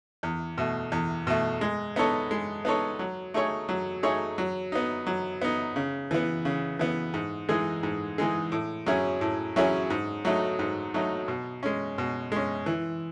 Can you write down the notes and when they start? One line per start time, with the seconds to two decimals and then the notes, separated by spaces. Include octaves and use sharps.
0.23 E2
0.58 B2 A3
0.92 E2
1.27 B2 A3
1.61 G#3
1.96 B3 D#4 A4 C#5
2.31 G#3
2.65 B3 D#4 A4 C#5
2.99 F#3
3.34 A3 D#4 G#4 C#5
3.69 F#3
4.03 A3 D#4 G#4 C#5
4.38 F#3
4.72 B3 D#4
5.07 F#3
5.42 B3 D#4
5.76 C#3
6.11 E3 B3
6.45 C#3
6.79 E3 B3
7.14 G#2
7.49 E3 G#3 D#4 G#4
7.83 G#2
8.18 E3 G#3 D#4 G#4
8.52 A2
8.86 F#3 C#4 E4 G#4
9.21 A2
9.56 F#3 C#4 E4 G#4
9.90 G#2
10.25 F#3 A3 D#4
10.59 G#2
10.94 F#3 A3 D#4
11.28 B2
11.63 G#3 C#4
11.98 B2
12.32 G#3 C#4
12.66 E3